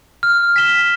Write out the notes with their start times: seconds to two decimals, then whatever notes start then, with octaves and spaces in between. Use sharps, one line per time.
0.23 F6
0.56 B6 E7 G7